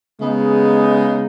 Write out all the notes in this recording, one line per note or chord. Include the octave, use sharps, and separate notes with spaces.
C#3 G#3 B3 D#4